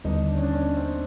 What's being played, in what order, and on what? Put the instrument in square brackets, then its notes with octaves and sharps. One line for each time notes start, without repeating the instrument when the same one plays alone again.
[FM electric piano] D#2 D3 G3 B3 [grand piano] D#4
[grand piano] D4
C#4
D4
C#4
C4